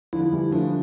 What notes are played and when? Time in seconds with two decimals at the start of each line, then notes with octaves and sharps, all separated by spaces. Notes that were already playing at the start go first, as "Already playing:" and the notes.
0.13 D3 F3 E4
0.25 E4
0.32 E3 G3
0.39 E4
0.52 F3 A3 D4